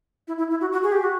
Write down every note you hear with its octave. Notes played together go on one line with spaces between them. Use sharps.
E4
E4
E4
F#4
F#4
G#4
G4
F#4